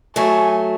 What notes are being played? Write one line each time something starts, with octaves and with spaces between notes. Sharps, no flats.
F#3 A3 G#5